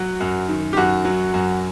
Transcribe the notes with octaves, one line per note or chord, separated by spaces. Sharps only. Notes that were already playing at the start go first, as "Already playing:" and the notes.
Already playing: F#3 F#4
F#2
D#3
G4
F#2 F#4
F#3
F#2